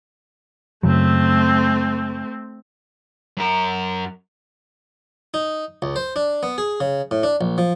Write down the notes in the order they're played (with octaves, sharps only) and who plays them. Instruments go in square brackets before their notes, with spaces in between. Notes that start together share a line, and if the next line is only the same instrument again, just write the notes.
[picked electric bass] F#2 C#3 F#3 [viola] A3 C4
[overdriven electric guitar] F#2 A#4
[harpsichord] D#4
C#2
C5
D4
B3
G#4
C#3
A2
D4
A#1
F3